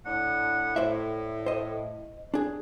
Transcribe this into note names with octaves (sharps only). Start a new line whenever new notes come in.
A2 D4 F#5
A2 C5 D5 E5
C5 D#5
D4 G#4